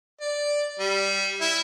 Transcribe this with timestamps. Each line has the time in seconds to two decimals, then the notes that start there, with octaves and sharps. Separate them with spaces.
0.21 D5
0.79 G3
1.41 E4